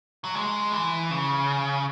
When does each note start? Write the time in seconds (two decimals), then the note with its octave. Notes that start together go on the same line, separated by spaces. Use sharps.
0.25 F#3
0.35 G#3
0.73 E3
1.11 C#3